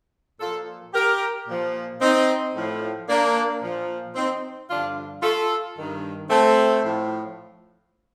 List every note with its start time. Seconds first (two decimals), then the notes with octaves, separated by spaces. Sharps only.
0.40 A#2 F3 F4 A4
0.94 G4 A#4
1.48 A#2 F3
2.01 C4 D#4
2.55 A2 F3
3.09 A#3 D4
3.62 A#2 F3
4.16 C4 D#4
4.70 G2 D3 F3 D4 F4
5.23 F4 A4
5.77 G2 D#3
6.30 A3 C4
6.84 A2 F3